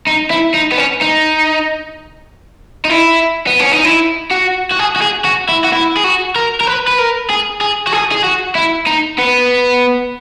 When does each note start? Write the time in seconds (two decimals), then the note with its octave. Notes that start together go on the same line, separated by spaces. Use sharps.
0.07 D#4
0.30 E4
0.54 D#4
0.72 B3
0.78 C#4
1.01 D#4
2.85 D#4
2.90 E4
3.47 B3
3.60 C#4
3.72 D#4
3.85 E4
4.31 F#4
4.71 F#4
4.79 G#4
4.96 F#4
5.02 G#4
5.25 F#4
5.49 E4
5.64 F#4
5.73 E4
5.97 G#4
6.04 F#4
6.36 A#4
6.61 A#4
6.67 B4
6.88 B4
6.99 A#4
7.30 G#4
7.61 G#4
7.87 F#4
7.93 G#4
8.12 G#4
8.24 F#4
8.55 E4
8.87 D#4
9.19 B3